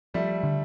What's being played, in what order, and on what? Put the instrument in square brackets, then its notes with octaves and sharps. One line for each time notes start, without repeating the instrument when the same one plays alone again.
[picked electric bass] F3 [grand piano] G3 A3
[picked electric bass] D3